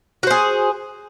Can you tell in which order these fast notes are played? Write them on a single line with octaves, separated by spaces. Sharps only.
F#4 C5 G#4